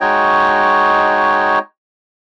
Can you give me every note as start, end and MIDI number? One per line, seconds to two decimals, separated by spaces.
0.01 1.59 56
0.01 1.59 63
0.01 1.59 66
0.01 1.59 73
0.01 1.59 75
0.01 1.59 79